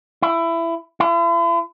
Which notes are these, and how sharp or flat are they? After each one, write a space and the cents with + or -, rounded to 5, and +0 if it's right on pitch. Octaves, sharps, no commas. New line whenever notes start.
E4 +20
E4 +45